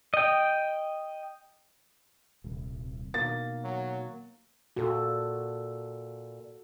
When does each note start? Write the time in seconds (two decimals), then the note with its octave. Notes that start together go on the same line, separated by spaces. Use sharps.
0.14 D#5 G5
2.44 D#1 C2
3.14 B2 D#3 A#3 A6
3.64 F#3
4.76 A#2 F#4 A4